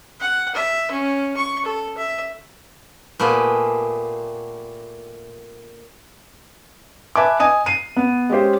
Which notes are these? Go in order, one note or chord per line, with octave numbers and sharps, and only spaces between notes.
F#5
E5
C#4
C#6
A4
E5
A#2 A3 B3 G4 G#4
B4 E5 G#5 A5 D6
D#5 G#5 D#6 D#7
C7 D#7
B3
G#3 C#4 G4 C5